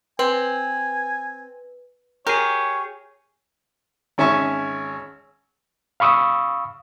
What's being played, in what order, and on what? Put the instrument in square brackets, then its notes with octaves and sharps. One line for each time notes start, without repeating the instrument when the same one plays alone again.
[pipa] C4 [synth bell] B4 [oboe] G#5
[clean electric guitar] G4 G#4 [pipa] A#4 [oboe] C#5
[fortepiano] G#1 C#4 E5 G#5 C#6
[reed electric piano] F5 B5 C#6 D#6 E6